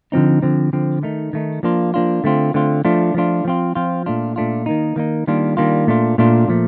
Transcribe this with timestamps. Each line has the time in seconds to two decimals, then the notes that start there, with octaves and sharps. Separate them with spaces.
0.12 D3 F3 C4 D#4
0.42 D3 F3 C4
0.73 D3 F3 C4
1.03 D#3 A3 D#4
1.33 D#3 A3 D#4
1.63 F3 A#3 D4 F4
1.94 F3 A#3 D4 F4
2.24 D3 A3 C4 F4
2.54 D3 A3 C4 F4
2.85 F3 A3 D4 F4
3.14 F3 A3 D4 F4
3.45 F3 C4 F4
3.75 F3 C4 F4
4.06 A#2 A3 D4 F4
4.36 A#2 A3 D4 F4
4.66 D#3 A#3 D#4
4.96 D#3 A#3 D#4
5.27 D#3 G3 A#3 D4 F4
5.57 D#3 G3 A#3 D4 F4
5.87 A#2 A3 D4 F4
6.18 A#2 A3 D4 F4
6.48 A#2 F3 A3